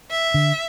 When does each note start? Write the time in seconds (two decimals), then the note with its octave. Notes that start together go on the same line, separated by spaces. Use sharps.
0.11 E5
0.34 D3